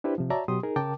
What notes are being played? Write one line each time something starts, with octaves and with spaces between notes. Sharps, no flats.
D4 E4 G4 B4 C5
C3 F3
F#4 C#5 D5 E5 A5 A#5
B2 F#3 G4 C6 D#6
D#4 G#4 A#4
C#3 A#4 G5 A5 D6